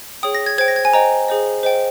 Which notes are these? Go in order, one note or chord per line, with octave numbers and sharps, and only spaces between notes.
G#4 C#5 G5 D#6
A#6
G#6
C5 G5 G#6
A#6
G#6
G#5
C5 D#5 G5 A#5
G#4 C5 D#5
C5 D#5 G5